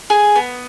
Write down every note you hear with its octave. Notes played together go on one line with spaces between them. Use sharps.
G#4
B3